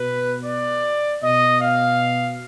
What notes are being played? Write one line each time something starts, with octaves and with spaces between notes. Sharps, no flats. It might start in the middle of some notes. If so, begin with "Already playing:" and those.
Already playing: B2 B4
D5
B2 D#5
F5